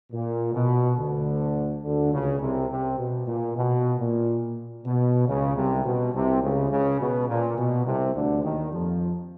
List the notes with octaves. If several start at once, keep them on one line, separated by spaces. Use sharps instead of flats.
A#2
B2
D2 D3
D2 D3
C#2 C#3
C2 C3
C2 C3
B2
A#2
B2
A#2
B2
C#2 C#3
C2 C3
B2
C2 C3
C#2 C#3
C#2 C#3
B2
A#2
B2
C2 C3
D2 D3
D#2 D#3
F2 F3